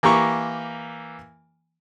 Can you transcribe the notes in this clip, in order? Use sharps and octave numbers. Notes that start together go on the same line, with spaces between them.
E3 A#3 G4 A#5 C#6